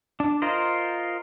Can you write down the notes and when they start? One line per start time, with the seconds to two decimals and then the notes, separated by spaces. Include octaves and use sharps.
0.20 D4
0.42 F4 A#4 C5 D#5